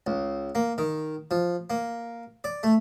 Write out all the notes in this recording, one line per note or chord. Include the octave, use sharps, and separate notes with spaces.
C#2
A#3
D#3
F3
A#3
D5
A3